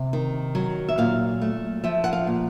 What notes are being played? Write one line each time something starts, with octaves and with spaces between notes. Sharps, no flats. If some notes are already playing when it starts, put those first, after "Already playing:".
Already playing: C3
D#3
F#3
E5
A#2 F5
A3
F3 E5
F#5
F5
A#2